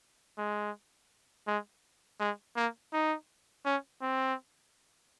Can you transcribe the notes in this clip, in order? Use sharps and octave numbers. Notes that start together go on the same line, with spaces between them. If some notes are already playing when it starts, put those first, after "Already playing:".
G#3
G#3
G#3
A#3
D#4
C#4
C4